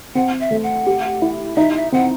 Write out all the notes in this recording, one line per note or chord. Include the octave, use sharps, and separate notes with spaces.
C4 F#5
E5
A3
F#5
G4
E4
D#4 E5
E5
C4 F#5